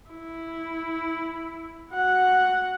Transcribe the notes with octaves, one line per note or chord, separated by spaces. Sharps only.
E4
F#4 F#5